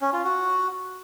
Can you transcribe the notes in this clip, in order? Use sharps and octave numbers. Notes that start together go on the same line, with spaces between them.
C#4
F4
F#4